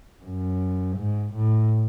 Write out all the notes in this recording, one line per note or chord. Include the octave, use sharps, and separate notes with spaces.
F#2
G#2
A2